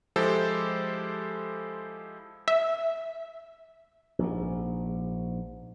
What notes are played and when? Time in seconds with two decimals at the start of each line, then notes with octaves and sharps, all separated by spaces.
0.16 F3 G#3 E4 G4 A4 C5
2.48 E5
4.19 A#1 G#2